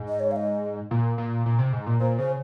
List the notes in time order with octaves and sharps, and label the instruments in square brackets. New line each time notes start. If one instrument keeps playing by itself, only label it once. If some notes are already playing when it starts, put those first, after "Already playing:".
Already playing: [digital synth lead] G#2
[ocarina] D#5
C#5
F5
D#5
[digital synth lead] A#2
A#2
A#2
C3
G#2
A#2
[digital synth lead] A#2 [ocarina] C5
[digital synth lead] C#3 [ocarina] C5